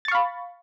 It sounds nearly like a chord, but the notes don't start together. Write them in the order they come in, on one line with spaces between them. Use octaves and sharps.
A6 C#6 F5 B5